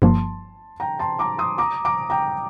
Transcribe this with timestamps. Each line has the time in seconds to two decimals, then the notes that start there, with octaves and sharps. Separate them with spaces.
0.02 G1 G2 F3 A#3 A5 C6
0.80 G5 A#5
0.99 A5 C6
1.19 A#5 D6
1.38 C6 D#6
1.58 A#5 D6
1.85 A#5 D6
2.10 G5 A#5